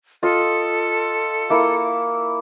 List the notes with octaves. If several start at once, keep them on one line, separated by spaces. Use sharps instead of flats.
F4 A4 D#5
A#3 E4